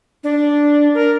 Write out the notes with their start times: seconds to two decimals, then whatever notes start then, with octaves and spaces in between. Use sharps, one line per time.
0.24 D4
0.94 A#4